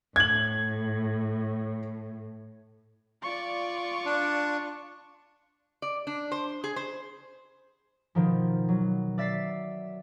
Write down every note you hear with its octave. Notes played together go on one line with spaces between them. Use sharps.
A2 G#6 F#7
F4 D5 C#6
D4
D5
D4
C5
G#4
C5
B2 D#3 F3
F#3
D5 E5 A6 B6 C7